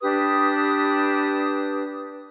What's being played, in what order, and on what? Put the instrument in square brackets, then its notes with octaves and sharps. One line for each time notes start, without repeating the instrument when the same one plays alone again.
[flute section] D4 G4 B4 D#6